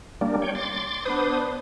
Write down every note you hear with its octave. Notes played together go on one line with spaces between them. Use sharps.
G3 A#3 D4
C#5 G5
C6 D6 A6
B3 D4 B4 C5 D#6